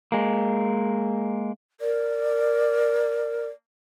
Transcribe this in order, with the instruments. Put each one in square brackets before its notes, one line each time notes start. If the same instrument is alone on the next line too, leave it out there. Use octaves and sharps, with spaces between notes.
[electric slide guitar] G#3 A#3
[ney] A#4 [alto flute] D5